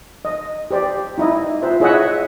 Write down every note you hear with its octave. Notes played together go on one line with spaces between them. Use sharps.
D#5
G4 C5 D5
D#4 E4 D#5
F4 C5 E5
E4 G#4 C#5 D#5 E5 F#5